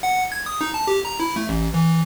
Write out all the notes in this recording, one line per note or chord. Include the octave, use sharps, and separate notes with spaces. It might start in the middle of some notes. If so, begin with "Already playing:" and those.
F#5
G#6
D#6
D#4
A5
G4
A#5
E4
A3
A1
E3